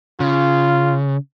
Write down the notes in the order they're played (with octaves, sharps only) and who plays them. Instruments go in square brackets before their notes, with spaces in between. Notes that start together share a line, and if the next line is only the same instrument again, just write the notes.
[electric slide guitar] C#3 [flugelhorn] F4